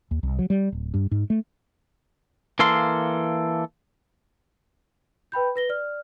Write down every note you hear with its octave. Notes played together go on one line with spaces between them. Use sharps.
D#2
C2
F#3
G3
D1
G2
G#2
A3
E3 A#3 A4 F5 C6
B4 G5 B5 G6
B4 A#6 G7
D5 F6